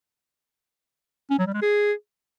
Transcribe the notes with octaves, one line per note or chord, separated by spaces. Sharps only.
C#4
F#3
G3
G#3
G#4